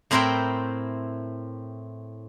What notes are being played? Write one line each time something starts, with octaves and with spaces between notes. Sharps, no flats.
A2 C4 E4 A#4 C5 G5